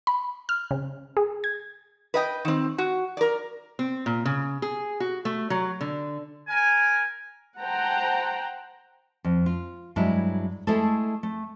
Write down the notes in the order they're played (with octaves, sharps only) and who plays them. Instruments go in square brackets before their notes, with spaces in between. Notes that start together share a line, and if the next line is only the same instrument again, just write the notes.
[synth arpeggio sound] B5
F6
C#3
G#4
G#6
[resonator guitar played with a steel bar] B4 D#5 G5
D#3 C4
F#4
A#4 D5
C4
A#2
C#3
G#4
F#4
A3
F#3
D3
[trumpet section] A#4 G#5
[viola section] C5 F#5 G5 A5 A#5
[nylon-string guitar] F2
F4
G2 F#3 G#3 E4
G#3 A3 E4 G#4 A4
A3